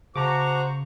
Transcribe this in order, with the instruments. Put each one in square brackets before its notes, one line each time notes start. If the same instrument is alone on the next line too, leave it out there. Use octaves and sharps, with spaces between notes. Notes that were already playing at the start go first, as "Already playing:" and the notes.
[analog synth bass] C#3 [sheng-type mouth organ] F#4 C5 [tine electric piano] A5 D6 [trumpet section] A#5 C#6